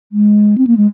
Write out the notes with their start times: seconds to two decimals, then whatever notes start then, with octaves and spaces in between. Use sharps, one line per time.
0.12 G#3
0.58 C4
0.67 A#3
0.77 G#3